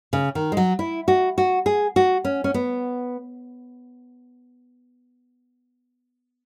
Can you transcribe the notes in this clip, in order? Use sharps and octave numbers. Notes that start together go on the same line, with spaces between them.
C#3
D#3
G#3
F#3
E4
F#4
F#4
G#4
F#4
C#4
C#4
B3